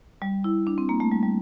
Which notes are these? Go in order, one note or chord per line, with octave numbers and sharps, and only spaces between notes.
G3
E4
D4
C4
A#3
A3
G3
G3